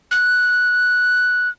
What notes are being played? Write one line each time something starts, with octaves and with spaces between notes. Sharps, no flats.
F#6